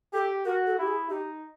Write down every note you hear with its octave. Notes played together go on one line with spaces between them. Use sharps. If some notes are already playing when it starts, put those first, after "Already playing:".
G4 A4
F#4 A#4
A4
E4 G4
G#4
D#4 G4